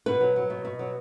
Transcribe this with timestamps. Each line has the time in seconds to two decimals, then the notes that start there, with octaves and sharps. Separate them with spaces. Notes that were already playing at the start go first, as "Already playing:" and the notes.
0.06 B2 B4
0.21 F#3
0.36 F#3
0.50 B2
0.65 B2
0.79 F#3